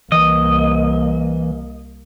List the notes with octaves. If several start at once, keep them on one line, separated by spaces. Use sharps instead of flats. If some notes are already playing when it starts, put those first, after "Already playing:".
C2 E3 A#3 D#5